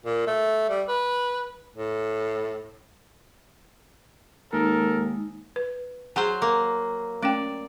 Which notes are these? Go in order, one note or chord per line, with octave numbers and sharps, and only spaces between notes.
A#2
A3
G3
B4
A2
D#2 G#3 D#4 A4 A#4
B4
F#3 G#4 C5 F#5 G#5
A#3
A3 C#4 D5 G5